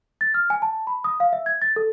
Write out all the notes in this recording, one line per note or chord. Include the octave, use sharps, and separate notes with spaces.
A6
F6
G#5
A5
B5
D#6
F5
E5
G#6
A6
A4